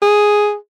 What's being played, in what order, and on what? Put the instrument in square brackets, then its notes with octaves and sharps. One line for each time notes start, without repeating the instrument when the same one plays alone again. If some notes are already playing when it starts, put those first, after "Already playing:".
[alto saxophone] G#4